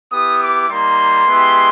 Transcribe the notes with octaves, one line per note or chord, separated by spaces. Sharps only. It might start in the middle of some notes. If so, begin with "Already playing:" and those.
B3 E4 G4 D#6
D6
G3 A#3 D#4 C6
G#3 B3 E4 G4